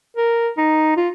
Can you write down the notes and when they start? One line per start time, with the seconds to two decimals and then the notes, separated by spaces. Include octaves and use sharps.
0.16 A#4
0.57 D#4
0.96 F4